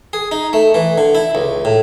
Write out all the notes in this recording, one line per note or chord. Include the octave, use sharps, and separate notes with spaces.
G#4
D#4
A3
E3
D3
E4
C#2
A2